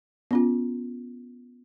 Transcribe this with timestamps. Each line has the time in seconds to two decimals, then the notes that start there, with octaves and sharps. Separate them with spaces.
0.31 B3 C#4 F4